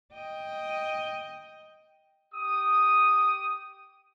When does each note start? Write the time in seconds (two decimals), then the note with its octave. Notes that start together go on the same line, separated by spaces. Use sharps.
0.13 D#5 G5
2.34 G4 D#6